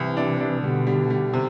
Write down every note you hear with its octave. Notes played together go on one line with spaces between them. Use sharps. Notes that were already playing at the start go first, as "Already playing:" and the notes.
Already playing: C2 C3 E3
D4
D4
B2 D3 G3
G3
G3
C3